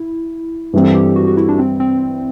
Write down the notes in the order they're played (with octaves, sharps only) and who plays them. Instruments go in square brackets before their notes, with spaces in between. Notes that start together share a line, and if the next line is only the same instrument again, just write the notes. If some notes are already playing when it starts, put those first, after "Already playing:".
Already playing: [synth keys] E4
[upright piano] G2 E3 G3 C4
[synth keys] A4
G4
F#4
F#4
E4
D4
C4
C4